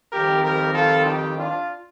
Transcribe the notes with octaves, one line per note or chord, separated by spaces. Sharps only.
F2 D#3 G3 C4 G4 A#4
G4 A#4
F4 A4
D#4 G4
D4 F4